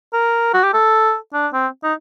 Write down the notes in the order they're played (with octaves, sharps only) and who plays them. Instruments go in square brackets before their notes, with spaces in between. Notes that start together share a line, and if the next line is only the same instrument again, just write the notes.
[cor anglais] A#4
F#4
G4
A4
D4
C4
D#4